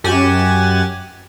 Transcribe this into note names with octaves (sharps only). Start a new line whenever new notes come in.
F#2 G4 F#5 G#5 A6 E7